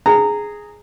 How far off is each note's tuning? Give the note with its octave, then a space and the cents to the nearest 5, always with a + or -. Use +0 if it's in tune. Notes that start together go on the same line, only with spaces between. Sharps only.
G#4 +0 A#5 -15